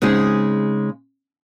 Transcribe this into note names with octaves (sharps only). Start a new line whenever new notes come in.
C#3 G#3 C4 D#4 G#4